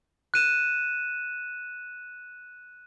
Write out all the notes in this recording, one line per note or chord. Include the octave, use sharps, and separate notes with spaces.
F#6 D#7 E7